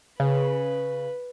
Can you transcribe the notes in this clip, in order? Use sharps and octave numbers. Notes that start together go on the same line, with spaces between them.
C#3 B4